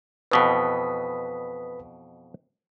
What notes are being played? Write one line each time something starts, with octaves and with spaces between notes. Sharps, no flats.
F2 B2 E3 B4 D#6 B6